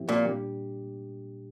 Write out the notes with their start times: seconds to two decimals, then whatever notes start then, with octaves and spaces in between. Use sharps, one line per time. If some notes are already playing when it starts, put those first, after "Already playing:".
Already playing: A2 F3 C4 E4 G4
0.09 A#2
0.25 A#2 G3 D4 G4